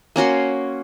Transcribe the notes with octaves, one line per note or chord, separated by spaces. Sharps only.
A#3 C#4 F#4 C6